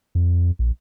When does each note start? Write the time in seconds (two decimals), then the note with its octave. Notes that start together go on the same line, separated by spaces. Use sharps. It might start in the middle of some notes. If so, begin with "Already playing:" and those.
0.15 F2
0.59 A#1